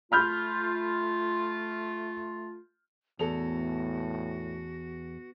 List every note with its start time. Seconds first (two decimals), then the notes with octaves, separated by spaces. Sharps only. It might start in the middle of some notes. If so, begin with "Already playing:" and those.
0.12 A3 F4 B5 F6 G6
3.19 E2 A2 F#4 A4 F7